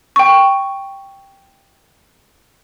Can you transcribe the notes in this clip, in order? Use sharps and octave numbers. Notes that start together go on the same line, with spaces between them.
G5 C#6